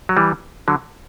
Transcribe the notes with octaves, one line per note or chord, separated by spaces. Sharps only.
F#3
E3 G3
D3 F#3